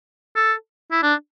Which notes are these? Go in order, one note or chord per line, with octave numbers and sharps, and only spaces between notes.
A4
E4
D4